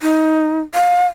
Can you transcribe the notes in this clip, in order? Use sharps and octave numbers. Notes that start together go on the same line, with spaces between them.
D#4
F5